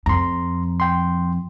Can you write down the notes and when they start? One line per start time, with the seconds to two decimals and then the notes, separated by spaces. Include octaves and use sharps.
0.06 F2 A#5 C6
0.80 G5 C6